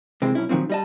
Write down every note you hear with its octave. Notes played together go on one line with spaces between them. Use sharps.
C3 E3 G#3 C4
B1 C#4 E4
A#2 D#3 F3 F#3 C4
G3 D#5 A5